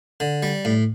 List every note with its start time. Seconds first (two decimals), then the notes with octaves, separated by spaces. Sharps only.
0.20 D3
0.43 G3
0.65 A2